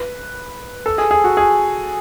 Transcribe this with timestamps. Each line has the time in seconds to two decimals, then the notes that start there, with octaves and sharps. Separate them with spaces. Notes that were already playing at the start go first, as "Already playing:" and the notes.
Already playing: B4
0.86 A4
0.98 G#4
1.11 G#4
1.24 F#4
1.37 G#4